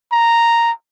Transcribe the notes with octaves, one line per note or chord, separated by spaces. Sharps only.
A#5